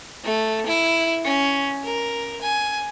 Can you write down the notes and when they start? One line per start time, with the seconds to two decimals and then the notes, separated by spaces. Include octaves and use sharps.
0.25 A3
0.66 E4
1.25 C#4
1.84 A#4
2.42 G#5